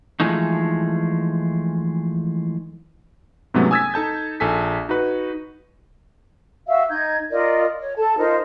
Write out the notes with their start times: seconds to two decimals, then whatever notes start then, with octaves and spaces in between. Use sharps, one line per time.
0.20 E3 F3 G#3 A3 D#4
3.54 G#2 C3 F#3 A3 B3 C#4
3.71 G#5 D#6 E6 G#6 A6 B6
3.94 D#4 A4 A5 G6
4.40 A#1 A4 G#5 B6
4.89 D#4 F#4 B4
6.67 F#4 E5 F5 E6
6.89 D#4 G6 G#6
7.31 F4 A#4 D5 D#5
7.80 C#5
7.97 A4 A5
8.17 D#4 F4 A#4 C5